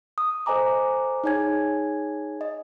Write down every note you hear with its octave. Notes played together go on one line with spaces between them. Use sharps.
D#6
A4 C5 D#5 G#5 A#5 D6
D#4 G#4 C#5 G#5 G#6
D#5